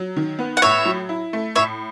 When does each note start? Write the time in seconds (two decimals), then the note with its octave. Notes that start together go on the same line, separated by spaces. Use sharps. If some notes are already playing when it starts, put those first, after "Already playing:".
Already playing: F#3
0.16 D#3
0.39 B3
0.57 F#5
0.62 A2 C#5 E5
0.85 F#3
1.09 E4
1.33 A3
1.56 A2 C#5 E5